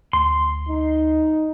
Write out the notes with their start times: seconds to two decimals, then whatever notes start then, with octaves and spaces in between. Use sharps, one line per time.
0.13 D2 C6
0.69 D#4